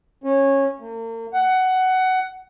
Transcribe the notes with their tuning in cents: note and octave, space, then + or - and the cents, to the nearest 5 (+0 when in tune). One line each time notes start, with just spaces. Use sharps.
C#4 -15
A#3 -40
F#5 +15